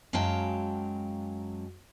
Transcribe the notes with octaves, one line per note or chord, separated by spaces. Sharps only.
F#2 F#3 G#3 F5 G5 A5